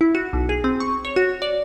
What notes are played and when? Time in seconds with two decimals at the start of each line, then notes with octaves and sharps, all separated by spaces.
0.01 E4
0.15 F#4
0.33 B1
0.49 G#4
0.64 C4
0.80 C#6
1.05 C#5
1.16 F#4
1.42 D5